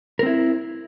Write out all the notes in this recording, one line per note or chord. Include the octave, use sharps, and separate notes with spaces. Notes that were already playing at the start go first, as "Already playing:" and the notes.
C4 E4 A#4